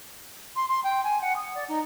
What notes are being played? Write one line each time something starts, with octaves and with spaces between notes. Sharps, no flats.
C6
C6
G5
G#5
F#5
D#6
D5
D#4